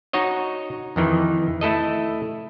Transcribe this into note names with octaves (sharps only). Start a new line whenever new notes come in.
D#4 F#4 C#5 D#5
F2 D#3 E3
A3 E4 A4 D#5